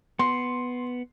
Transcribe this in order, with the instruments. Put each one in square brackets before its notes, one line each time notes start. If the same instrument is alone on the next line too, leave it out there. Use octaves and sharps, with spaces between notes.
[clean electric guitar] B3 [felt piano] C6